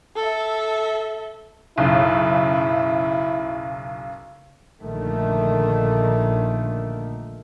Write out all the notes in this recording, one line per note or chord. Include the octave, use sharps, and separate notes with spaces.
A4 E5
B1 F#2 C#3 E4
A#1 A#2 D3 D#3 A3